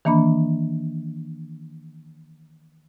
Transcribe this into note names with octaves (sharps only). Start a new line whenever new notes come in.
D#3 E3 A#3 D4 B5